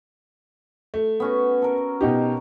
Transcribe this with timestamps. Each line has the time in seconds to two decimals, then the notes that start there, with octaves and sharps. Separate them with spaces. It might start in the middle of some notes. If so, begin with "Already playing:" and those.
0.94 A3
1.20 B3 C#4 F#4
1.62 A4 A#4
2.01 B2 D#4 G4